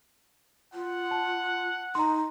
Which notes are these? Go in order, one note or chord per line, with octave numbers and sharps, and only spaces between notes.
F4 F#5
A5
D#4 A#5 C6